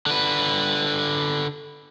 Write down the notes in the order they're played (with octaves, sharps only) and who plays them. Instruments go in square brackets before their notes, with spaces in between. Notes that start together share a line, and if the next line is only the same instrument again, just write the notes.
[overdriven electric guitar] D3 B4